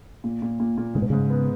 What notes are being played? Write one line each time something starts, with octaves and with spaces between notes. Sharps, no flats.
A#2
A#2
A#2
A#2
G#2 C#3
B2
G#2 C#3
B3